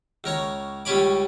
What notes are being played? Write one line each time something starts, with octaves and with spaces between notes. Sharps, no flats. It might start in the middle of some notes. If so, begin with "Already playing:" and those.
C#2 A#4 C#5 A#5
C#2 G3 C#4 C#5 B5 D6